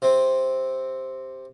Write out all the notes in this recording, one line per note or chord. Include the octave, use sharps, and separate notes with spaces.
C3 C4